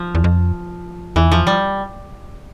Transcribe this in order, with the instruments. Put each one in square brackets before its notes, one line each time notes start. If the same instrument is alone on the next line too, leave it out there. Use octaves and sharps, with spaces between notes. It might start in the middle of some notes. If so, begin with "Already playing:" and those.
Already playing: [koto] F3
[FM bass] E2
F2
[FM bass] E2 [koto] E3
[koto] F3
G3